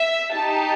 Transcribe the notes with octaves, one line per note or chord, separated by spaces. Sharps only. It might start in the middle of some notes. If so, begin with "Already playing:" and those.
Already playing: E5
D#4 G4 A5